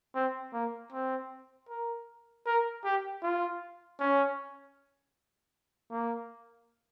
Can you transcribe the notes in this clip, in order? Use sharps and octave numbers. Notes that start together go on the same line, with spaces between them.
C4
A#3
C4
A#4
A#4
G4
F4
C#4
A#3